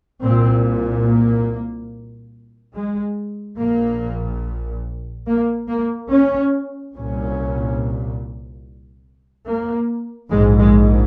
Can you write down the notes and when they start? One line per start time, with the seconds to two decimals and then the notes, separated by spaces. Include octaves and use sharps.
0.23 C2 A#2 C4
1.06 A#3
2.74 G#3
3.58 A#1 A#2 A#3
5.27 A#3
5.69 A#3
6.10 C#4
6.95 C2 A#2 C#4
9.47 A#3
10.31 A#1 G#2 G#3
10.59 G#3